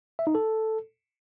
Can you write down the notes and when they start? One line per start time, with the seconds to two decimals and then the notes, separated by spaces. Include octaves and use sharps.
0.19 E5
0.27 D#4
0.35 A4